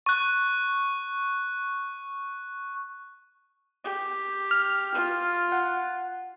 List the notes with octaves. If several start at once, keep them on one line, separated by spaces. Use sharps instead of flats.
C#6 F#6
G4
F6
F4
F#5